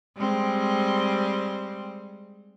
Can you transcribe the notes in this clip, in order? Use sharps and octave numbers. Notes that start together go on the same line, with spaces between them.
G3 G#3 C4